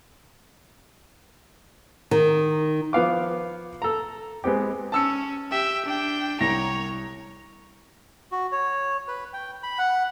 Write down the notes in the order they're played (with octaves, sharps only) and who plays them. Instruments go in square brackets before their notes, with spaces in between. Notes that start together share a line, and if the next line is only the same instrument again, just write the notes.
[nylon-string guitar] D#3
[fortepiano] F3 B3 F5 D6
A4 A#5
G#3 B3 C4 G4
[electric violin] C#4 [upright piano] A5 E6 C#7
[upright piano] G4 [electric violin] E5 G5
[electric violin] D4 G5
[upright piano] C2 A#6 [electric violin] C#5 A#5
[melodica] F#4
C#5
B4
G5
B5
F#5